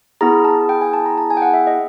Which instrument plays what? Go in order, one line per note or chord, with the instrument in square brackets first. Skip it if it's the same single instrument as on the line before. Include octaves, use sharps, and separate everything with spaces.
[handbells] B3 E4 G#4 A#5
A5
G5
G#5
A5
A#5
A5
G#5
G5
F#5
E5
D#5